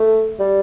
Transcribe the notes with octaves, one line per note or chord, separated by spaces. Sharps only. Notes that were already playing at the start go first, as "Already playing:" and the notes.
Already playing: A3
G3